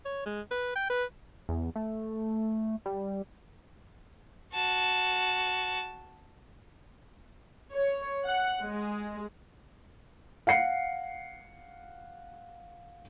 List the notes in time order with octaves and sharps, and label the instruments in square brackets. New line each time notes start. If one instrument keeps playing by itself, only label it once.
[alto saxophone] C#5
G#3
B4
G5
B4
[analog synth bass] E2
A3
G3
[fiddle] F#4 A5
[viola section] C#5
F#5
G#3
[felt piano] F5 F#5 C7 C#7